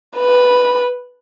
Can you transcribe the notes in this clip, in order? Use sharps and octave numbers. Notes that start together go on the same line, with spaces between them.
B4 B5